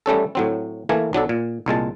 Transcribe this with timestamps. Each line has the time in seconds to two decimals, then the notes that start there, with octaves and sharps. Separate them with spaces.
0.06 G3 A3 C#4 A4
0.35 A2 F#3 C4
0.89 E3 A3 A#3 A#4 G#5
1.13 B1 F#3 D4 A4
1.29 A#2
1.66 C2 A#2 G#3 A5